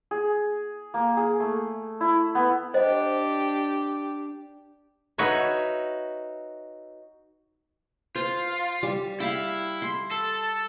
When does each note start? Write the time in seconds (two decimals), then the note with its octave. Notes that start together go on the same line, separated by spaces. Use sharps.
0.11 G#4
0.94 A#3
1.17 G#4
1.40 A3
2.00 E4
2.35 B3
2.74 D4 G4 C5 D#5
5.18 D#4 F#4 B4 C#5 E5
8.16 F4 C5
8.83 G3
9.20 E4 F5 G5
9.82 C6
10.11 A4